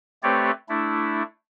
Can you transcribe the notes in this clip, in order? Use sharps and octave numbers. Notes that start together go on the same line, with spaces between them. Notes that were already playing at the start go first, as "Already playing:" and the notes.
A3 C4 G4 B4 C#5 D5
A3 D4 E4